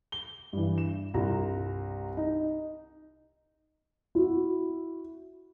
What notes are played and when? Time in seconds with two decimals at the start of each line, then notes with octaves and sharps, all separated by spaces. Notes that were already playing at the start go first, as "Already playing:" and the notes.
0.12 G7
0.53 G2 E3
0.78 E7
1.14 C2 G2 F4 A#5
2.17 D#4
4.15 E4 F#4